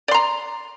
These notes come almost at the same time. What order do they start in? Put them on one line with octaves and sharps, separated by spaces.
D5 C6 A#5